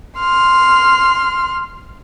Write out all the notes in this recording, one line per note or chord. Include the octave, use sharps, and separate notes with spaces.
C6 F6